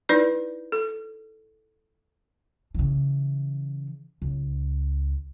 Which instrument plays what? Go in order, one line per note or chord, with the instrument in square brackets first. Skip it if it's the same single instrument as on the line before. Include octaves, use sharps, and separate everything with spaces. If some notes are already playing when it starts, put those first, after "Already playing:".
[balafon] D#4 E4 B4 D5
A4
[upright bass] C#3 E3
C#2